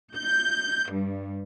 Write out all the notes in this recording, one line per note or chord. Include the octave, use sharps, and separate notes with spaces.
G6
G2